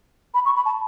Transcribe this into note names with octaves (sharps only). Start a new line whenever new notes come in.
B5
C#6
B5
A5